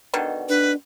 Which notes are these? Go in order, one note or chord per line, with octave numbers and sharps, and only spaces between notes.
B2 D3 D#3
D4 B4